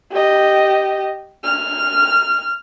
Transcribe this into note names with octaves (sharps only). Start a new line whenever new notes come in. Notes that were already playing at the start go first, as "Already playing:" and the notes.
G4 D#5
F6